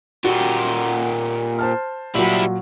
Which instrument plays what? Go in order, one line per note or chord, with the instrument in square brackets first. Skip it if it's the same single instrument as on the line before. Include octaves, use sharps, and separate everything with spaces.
[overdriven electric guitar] A#2 G4 [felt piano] F#4
[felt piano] C5 A5 F6
[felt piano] A#2 F#3 [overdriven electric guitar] G3 E4